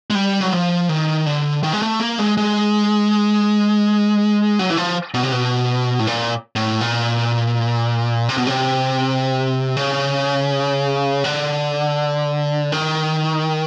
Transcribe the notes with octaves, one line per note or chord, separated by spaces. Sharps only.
G#3
G3
F#3
F3
D#3
D3
D#3
G#3
A3
A#3
G#3
G#3
F#3
E3
F3
B2
C3
B2
A2
A#2
A2
A#2
C3
B2
C3
C#3
D3
D#3